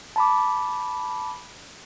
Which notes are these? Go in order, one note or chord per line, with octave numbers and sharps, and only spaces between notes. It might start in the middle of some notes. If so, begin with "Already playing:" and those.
A5 B5 D6